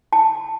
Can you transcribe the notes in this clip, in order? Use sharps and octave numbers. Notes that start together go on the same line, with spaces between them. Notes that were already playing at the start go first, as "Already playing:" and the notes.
A5